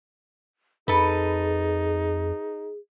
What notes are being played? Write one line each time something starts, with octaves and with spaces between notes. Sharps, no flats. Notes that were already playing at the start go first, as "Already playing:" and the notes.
F2 D#4 G#4 A4 B4